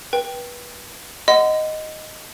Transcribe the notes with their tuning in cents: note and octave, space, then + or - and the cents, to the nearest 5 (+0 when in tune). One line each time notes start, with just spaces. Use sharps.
B4 -25 G5 +0
D#5 +0 F#5 +0 C6 -35